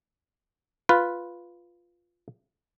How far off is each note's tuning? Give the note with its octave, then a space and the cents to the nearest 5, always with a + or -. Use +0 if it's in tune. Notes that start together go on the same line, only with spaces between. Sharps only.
F4 +0 B4 +0